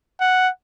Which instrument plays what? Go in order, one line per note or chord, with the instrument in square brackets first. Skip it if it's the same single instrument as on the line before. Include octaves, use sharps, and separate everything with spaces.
[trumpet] F#5